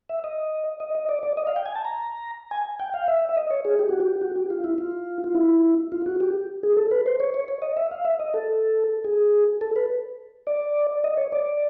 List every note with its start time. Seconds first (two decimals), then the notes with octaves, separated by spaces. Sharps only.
0.09 E5
0.24 D#5
0.80 D#5
0.95 D#5
1.09 D5
1.23 D5
1.37 D#5
1.47 F5
1.56 G5
1.66 G#5
1.75 A5
1.85 A#5
2.51 G#5
2.80 G5
2.94 F5
3.08 E5
3.29 E5
3.37 D#5
3.50 C#5
3.65 G#4
3.79 G4
3.89 F#4
4.00 G4
4.21 F#4
4.36 G4
4.50 F4
4.64 E4
4.78 F4
5.24 F4
5.35 E4
5.92 F4
6.06 F#4
6.20 G4
6.63 G#4
6.77 A4
6.91 B4
7.06 C5
7.20 C#5
7.34 C#5
7.48 C#5
7.62 D#5
7.77 E5
7.91 F5
8.05 E5
8.20 D#5
8.34 A4
9.04 G#4
9.61 A4
9.76 B4
10.47 D5
11.04 D#5
11.17 C#5
11.32 D5